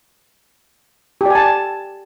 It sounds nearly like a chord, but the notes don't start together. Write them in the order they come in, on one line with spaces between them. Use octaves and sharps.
G4 D5 G#5 A5